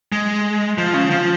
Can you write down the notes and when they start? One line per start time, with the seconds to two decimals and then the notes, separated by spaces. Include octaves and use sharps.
0.12 G#3
0.78 F3
0.94 C#3
1.10 F3